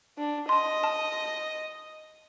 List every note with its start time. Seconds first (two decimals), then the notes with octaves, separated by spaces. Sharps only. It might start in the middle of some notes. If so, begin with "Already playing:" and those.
0.18 D4
0.49 D#5 A5 C6
0.84 A5